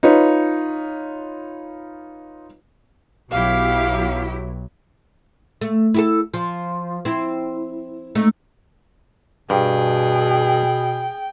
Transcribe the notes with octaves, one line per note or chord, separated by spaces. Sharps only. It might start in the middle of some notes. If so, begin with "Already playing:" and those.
D#4 F4 B4 C#5
B1 F#3 B3 E4 G4 F5
A3
E4 G4 A4
F3
C4 E4
A3 D#4
G2 B2 G#4 G5